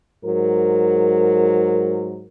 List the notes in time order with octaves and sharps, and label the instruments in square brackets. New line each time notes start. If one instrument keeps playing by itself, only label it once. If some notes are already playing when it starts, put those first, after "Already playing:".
[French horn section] G#2 F#3 A#4